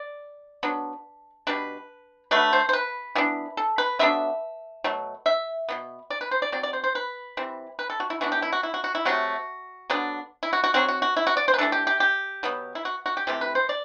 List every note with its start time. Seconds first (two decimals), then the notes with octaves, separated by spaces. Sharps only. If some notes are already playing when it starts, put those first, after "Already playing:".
Already playing: D5
0.63 F#3 B3 D4
1.47 B2 G3 D4 B4
2.31 D3 F#3 A3 B4
2.53 C5
2.69 C5
2.73 B4
3.15 E3 B3 D4
3.57 A4
3.78 B4
3.99 D3 F#3 B3 D4 E5
4.84 B2 F#3 A3
5.26 E5
5.69 B2 F#3 B3
6.10 D5
6.21 B4
6.31 C5
6.42 D5
6.52 F#3 C4 D5
6.63 D5
6.73 C5
6.84 C5
6.95 B4
7.37 E3 G3 C4
7.79 B4
7.90 A4
8.00 F#4
8.10 E4
8.21 E3 B3 D4 F#4
8.32 G4
8.42 E4
8.52 F#4
8.63 E4
8.74 F#4
8.84 F#4
8.95 E4
9.05 C3 F#3 A3 F#4
9.90 D3 F#3 B3 D4
10.43 E4
10.53 F#4
10.64 F#4
10.74 F#3 C4 F#4
10.88 F#4
11.02 F#4
11.17 E4
11.27 F#4
11.37 D5
11.48 C5
11.54 B4
11.58 E3 A3 D4 A4
11.72 G4
11.87 G4
12.00 G4
12.43 B2 F#3 B3
12.75 E4
12.85 F#4
13.06 F#4
13.17 G4
13.27 C3 E3 A3 C4 G4
13.41 B4
13.55 C5
13.69 D5